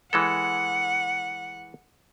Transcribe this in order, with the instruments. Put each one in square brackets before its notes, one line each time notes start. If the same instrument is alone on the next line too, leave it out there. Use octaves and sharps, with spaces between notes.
[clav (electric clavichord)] E3 G#3 A4 [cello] F#5